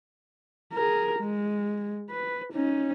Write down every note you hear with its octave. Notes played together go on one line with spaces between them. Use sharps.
G#4 A#4
G#3
B4
C#4 D#4